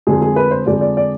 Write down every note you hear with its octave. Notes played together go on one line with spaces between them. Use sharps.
F2 D3 G#3 G#4
G#4
B4
C5
F2 D3 G#3 D5
D5
D5